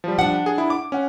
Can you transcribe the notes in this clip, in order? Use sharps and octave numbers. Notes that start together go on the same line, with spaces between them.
F3 G3
D4 F#5
G#4
E4
D6
C#4 F#5